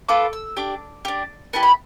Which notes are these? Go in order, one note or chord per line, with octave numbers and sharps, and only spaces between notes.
B3 F4 A4 D6
E6
D4 G4 D6
D4 G4
B3 E4 G4 A5
B5